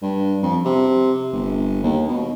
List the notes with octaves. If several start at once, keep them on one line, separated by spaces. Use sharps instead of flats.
G2
F2
C3
G1
D#2
B2